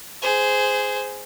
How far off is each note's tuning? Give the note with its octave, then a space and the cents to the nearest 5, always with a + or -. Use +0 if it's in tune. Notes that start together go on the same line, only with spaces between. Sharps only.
G#4 +0 C5 -15